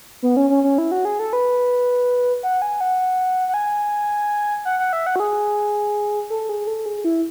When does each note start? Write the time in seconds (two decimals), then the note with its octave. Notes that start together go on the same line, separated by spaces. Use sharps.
0.23 B3
0.37 C#4
0.50 C#4
0.64 C#4
0.78 E4
0.92 F#4
1.05 G#4
1.19 A4
1.33 B4
2.43 F#5
2.62 G#5
2.81 F#5
3.49 F#5
3.54 G#5
4.65 F#5
4.79 F#5
4.93 E5
5.06 F#5
5.16 F#4
5.20 G#4
6.30 A4
6.49 G#4
6.67 A4
6.86 G#4
7.04 E4